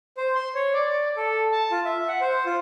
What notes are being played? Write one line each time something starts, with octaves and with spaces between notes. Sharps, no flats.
C5
C6
C#5
D5
A4
A5
F4
E5
F#5
C5
F4